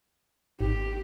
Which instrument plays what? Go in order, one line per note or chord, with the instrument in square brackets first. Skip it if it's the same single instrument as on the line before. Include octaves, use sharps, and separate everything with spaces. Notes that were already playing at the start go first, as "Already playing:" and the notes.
[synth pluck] G#1 [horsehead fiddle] G4